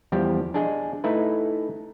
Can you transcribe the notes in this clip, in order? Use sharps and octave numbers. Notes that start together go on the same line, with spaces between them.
E2 F3 G3 G4
D4 G#4 D#5
A3 D#4 E4 B4